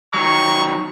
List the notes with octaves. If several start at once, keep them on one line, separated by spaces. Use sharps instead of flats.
D#3 F#3 C#6